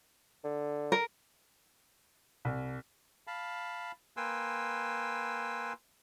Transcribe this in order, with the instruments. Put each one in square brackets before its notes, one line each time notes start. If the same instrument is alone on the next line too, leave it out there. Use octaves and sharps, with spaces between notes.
[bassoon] D3
[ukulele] A#4
[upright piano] C2
[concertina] F5 A5 B5
A#3 B4 G5 G#5 C6 E6